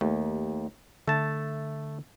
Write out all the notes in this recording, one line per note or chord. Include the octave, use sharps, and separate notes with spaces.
D#2 A3
D3 A3 A5